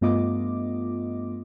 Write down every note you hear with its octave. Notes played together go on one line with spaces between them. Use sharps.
G2 A3 B3 F4 D#5 D6